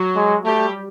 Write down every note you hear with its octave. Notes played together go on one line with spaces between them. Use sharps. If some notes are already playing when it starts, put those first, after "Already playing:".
Already playing: F#3 F#4
G#3
G3 A3 G4